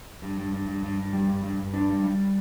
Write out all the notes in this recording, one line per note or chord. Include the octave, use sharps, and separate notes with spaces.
G2
G2
G2
G2
G2
G2
G3
G2
G2
G2
D4
G3
G3